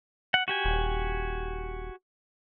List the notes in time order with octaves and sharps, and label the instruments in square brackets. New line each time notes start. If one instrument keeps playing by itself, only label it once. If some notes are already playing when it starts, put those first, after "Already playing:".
[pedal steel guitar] F#5
F#4 G4 G#5
[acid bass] D#1